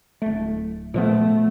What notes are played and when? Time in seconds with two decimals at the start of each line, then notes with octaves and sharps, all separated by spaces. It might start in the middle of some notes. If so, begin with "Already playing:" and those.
0.22 D1 A3
0.94 A#2 F3 A3 B3